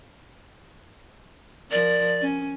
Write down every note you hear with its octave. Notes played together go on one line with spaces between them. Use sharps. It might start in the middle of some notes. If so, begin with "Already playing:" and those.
F3 A#4 D5
C#4